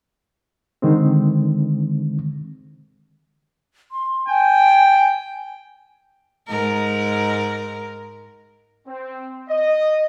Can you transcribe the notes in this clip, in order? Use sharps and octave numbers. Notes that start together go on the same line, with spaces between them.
D3 D#3 G#3 C4
C6
G5 G#5
G#2 G#3 A#4
C4
D#5